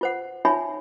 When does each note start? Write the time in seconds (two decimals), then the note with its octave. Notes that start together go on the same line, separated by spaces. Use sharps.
0.01 F4 C5 F#5
0.45 D#4 F4 C#5 E5 G#5 B5